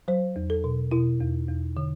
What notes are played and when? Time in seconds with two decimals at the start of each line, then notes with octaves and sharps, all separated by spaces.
0.08 F#3 C5
0.36 E2
0.50 A4
0.64 B2
0.91 B2 E4
1.20 E2
1.48 E2
1.77 D3